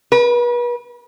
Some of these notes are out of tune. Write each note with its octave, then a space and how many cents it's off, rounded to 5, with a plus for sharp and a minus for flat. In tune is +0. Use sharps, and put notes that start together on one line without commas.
B4 -40